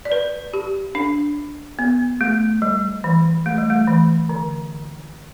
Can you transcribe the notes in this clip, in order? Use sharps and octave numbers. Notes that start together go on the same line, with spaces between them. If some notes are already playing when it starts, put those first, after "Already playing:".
D5
B4
G4
D4
B3
A3
G3
E3
A3
G3
A3
E3
D3